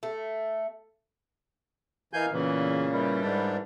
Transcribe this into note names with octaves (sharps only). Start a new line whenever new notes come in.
A3
E3 A#4 D#5 F5 G#5 G6
E2 A#2 C#3 E3
D#3 E3 G3
G#2 D4